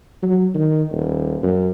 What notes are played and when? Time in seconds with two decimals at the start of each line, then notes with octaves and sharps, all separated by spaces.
0.22 F#3
0.55 D#3
0.92 D#1
1.43 F#2